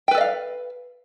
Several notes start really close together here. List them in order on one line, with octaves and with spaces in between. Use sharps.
G5 B4 A4 D#5 F5